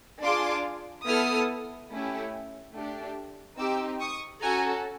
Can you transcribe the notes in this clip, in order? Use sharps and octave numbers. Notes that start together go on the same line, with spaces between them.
D4 F4 G#4 C6 D6
B3 E4 A4 D#6 F6
A3 C#4 E4 G4
A3 D4 G4
C4 D#4 G4 D6 E6
C#6 D#6
C#4 F#4 A4 G#5 A#5